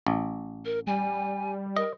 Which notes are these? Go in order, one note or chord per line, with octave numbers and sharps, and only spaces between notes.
A1
A#4
G3 G#5
A#4 D#5